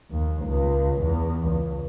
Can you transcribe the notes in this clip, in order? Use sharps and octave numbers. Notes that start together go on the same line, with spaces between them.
D#2
C#2
E2
C#2